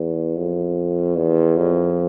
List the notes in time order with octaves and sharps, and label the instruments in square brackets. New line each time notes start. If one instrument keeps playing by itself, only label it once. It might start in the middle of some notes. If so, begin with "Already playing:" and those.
Already playing: [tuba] E2
F2
E2
F2